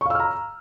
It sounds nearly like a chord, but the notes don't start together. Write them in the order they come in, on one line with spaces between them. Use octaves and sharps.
C#6 F5 E6 F6 A#5